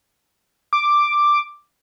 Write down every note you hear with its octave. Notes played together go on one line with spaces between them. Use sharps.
D6